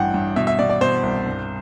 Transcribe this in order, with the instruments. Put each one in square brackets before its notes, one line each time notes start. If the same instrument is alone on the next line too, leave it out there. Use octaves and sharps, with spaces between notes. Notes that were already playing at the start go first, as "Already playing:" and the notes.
Already playing: [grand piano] A1 G2 E3 F#5 G5
G2
B2 E5
E5
B2 D5
D5
B2 C5
C2
G2